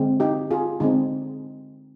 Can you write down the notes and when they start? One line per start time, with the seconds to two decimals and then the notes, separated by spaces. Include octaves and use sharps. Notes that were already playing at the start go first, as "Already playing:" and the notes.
Already playing: D3 G#3 C4
0.20 D#4 G4
0.51 F4 G#4
0.80 D3 G#3 C4 D#4